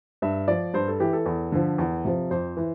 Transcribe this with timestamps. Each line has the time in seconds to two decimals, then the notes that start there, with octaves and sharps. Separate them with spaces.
0.22 G2 E5
0.48 F3 D5
0.74 G2 C5
0.88 A4
1.00 E3 G4
1.13 A4
1.26 E2
1.52 D3 F3
1.78 E2
2.05 C3 F3
2.31 F2 C5
2.57 E3